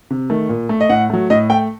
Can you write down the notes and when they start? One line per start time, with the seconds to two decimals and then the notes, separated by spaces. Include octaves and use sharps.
0.10 C3
0.30 D#3 A3
0.49 A#2
0.69 A3
0.81 D#5
0.89 A2 F#5
1.10 F#3 A3
1.30 A2 D#5
1.50 A3 G5